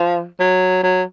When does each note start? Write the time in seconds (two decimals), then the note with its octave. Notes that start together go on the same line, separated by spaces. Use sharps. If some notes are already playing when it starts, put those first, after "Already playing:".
Already playing: F3
0.40 F#3
0.83 F#3